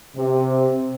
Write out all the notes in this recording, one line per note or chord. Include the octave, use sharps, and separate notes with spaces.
C3